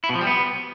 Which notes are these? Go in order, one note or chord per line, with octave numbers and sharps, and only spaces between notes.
E4
B2
F3
G3
B3